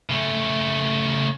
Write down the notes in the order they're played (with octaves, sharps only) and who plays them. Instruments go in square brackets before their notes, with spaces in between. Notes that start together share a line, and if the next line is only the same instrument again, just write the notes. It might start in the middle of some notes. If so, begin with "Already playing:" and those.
[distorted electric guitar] C#3 A3